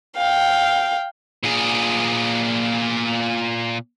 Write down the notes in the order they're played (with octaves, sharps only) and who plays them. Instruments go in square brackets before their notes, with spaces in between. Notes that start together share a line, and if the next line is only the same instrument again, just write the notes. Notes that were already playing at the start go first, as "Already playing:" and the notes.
[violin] F5 G5
[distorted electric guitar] A#2 G#4